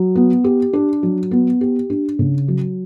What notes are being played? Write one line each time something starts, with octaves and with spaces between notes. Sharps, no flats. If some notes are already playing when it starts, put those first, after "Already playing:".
Already playing: F#3
B3
G4
D4
F#3
B3
G4
D4
C#3
F#3